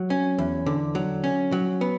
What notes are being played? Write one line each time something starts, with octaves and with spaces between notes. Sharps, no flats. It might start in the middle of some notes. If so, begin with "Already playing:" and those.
Already playing: F#3
C#4
E2
D3
F#3
C#4
F#3
B3